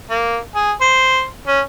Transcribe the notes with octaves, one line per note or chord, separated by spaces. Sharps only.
A#3
G#4
C5
C#4